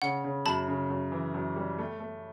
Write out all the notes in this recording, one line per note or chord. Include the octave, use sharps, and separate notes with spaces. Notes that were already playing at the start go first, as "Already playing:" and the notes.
C#3 F#5
C#3
F#2 A5 B5
C#3
F#2
E3
F#2
G3
A3
A3